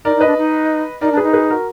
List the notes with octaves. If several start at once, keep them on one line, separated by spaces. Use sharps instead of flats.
D#4 A#4 D5
D#4
B4 D#5
D4
D#4
D#4 A#4 D5
D4
G#4 B4
D#4
G#4 B4
F#4 A#4